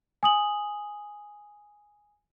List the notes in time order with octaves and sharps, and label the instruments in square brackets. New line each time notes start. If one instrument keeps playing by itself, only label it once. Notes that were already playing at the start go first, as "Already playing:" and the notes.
[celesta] G#5 D#6 F#7